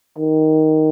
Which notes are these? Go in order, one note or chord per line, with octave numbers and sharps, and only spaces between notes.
D#3